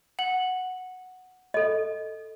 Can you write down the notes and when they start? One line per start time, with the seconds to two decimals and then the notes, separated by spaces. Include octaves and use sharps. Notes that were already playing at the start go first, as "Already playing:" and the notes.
0.19 F#5 F#7
1.54 A4 D#5